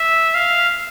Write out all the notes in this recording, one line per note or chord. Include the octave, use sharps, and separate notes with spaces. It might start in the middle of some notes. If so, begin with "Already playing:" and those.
Already playing: E5
F5